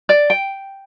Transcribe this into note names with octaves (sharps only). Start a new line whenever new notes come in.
D5
G5